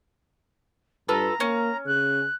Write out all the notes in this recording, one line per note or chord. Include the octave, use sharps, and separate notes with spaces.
G2 F4 A4 B4 A#5
A#3 C#4
C#3 F#6